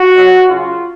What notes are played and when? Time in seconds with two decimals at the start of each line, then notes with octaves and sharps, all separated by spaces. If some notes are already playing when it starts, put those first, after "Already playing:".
Already playing: F#4
0.14 B2 F#3
0.48 C#3 F#3 F4